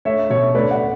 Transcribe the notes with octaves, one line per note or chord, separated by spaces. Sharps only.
A3 C#5 E5
B2 C#5 E5
A3 B4 D5
D5 F#5